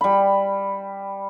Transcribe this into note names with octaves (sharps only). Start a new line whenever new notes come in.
G3 B5